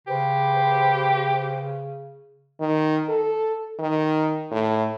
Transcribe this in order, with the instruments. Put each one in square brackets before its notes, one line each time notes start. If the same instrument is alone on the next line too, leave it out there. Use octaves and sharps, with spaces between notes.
[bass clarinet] C#3 [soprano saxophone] G4 [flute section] B4 C5
[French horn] D#3
A4
D#3
A2